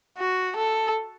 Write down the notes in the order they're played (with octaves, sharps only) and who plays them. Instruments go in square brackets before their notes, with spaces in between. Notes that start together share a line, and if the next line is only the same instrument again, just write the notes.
[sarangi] F#4
A4